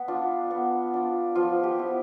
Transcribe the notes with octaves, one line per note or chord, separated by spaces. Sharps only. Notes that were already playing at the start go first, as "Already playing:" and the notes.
Already playing: B3
D4 F4
B3
D4 F4
F3 F4
G4
B3 E4